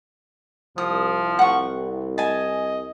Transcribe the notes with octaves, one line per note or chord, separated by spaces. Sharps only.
C2 F3 D#6
F#5 C#6
D#5 G#5 A5